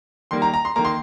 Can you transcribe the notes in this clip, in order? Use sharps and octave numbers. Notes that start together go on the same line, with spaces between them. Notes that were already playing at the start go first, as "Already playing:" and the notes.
D#3 G3 A#3 C6
A#5
A#5
C6
D#3 A#3 A#5
C6